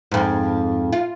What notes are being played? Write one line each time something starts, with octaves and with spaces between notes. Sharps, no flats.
F2 G#2
F4